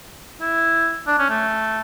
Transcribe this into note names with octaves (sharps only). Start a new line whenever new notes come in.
E4
D4
C#4
A3